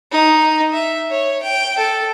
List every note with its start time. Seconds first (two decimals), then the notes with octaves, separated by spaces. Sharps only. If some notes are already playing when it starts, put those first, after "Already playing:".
0.12 D#4
0.73 E5
1.10 C#5
1.42 G5
1.78 A4